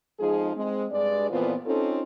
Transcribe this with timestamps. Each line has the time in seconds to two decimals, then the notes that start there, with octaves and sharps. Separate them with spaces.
0.19 F2 F3 G#3 D#4 G#4
0.55 G#3 C4
0.91 G2 G#3 D5
1.30 F2 A#2 E3 B3 C4 F4
1.65 C4 C#4 D#4 F4 A4